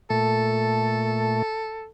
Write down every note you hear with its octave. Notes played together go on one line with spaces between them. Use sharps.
A#2 A3 A4